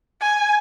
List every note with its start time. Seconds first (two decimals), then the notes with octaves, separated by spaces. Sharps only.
0.21 G#5